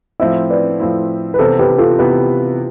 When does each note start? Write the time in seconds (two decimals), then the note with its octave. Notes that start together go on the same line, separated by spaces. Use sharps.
0.20 A2 F3 C4 E4 C5 E5
0.50 B4 D5
0.80 A2 F3 C4 E4
1.34 B4
1.39 C3 E3 B3 E4 A4 C5
1.59 G4 B4
1.78 F4 A4
1.99 C3 E3 B3 E4 G4 B4